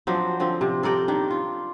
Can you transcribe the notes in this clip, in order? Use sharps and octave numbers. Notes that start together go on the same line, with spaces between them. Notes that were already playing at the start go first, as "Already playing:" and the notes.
F3 F#3 C4 D4
D3 F3 C4
C3
A4 A#4 D5 G5
D#3 D4
F4